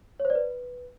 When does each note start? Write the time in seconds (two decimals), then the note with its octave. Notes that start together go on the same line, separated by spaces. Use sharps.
0.20 C#5
0.25 C5
0.30 D5
0.35 B4